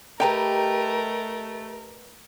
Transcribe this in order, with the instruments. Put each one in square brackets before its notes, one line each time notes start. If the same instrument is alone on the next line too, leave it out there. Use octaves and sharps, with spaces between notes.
[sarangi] A3 [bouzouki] G4 B4 D#5 [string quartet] A#4 [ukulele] G5 A#5